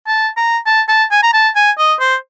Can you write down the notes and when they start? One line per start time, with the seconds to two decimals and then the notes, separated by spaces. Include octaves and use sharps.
0.07 A5
0.37 A#5
0.66 A5
0.89 A5
1.11 G#5
1.23 A#5
1.33 A5
1.56 G#5
1.78 D#5
2.00 C5